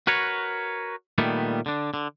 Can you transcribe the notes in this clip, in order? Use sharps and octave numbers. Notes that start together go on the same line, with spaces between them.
F#4 A#4 B4 C#5
A#2 D#3 G3 A3 B3
D3 D4
D3